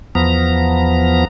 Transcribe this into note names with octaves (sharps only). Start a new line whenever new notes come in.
E2 F3 B3 A#5